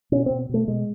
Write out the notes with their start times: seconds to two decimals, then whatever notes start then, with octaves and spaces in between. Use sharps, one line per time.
0.12 B2 C#4
0.26 B2 C4
0.49 B2 A3
0.68 B2 G#3